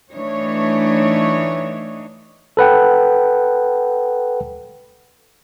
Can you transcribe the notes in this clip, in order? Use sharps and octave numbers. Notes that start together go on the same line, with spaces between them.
E3 A3 D4 D#4 C#5
A4 B4 F#5 G5